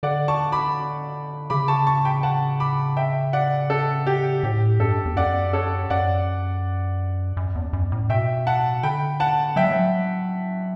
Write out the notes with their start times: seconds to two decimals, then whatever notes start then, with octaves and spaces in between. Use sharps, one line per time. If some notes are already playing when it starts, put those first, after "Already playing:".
0.03 D3 D5 F#5
0.28 A5 C#6
0.52 B5 D6
1.50 C#3 B5 D6
1.68 A5 C#6
1.87 A5 C#6
2.05 G5 B5
2.23 F#5 A5
2.60 B5 D6
2.97 E5 G5
3.33 D5 F#5
3.70 A4
4.06 G4
4.43 A2 G4
4.80 G2 A4
5.06 E2
5.16 F#2 D5 F#5
5.53 A4 C#5
5.90 F#2 D5 F#5
7.37 F#2
7.55 E2
7.73 F#2
7.92 A2
8.09 B2 E5 G5
8.47 F#5 A5
8.83 D3 G5 B5
9.20 F#5 A5
9.56 F#3 E5 G5
9.64 G3
9.71 F#3